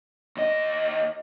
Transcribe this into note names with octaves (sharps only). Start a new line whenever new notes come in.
D#2 D#5